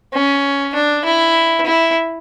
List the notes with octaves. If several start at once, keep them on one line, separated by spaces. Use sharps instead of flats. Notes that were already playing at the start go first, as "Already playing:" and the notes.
C#4
D4
E4
E4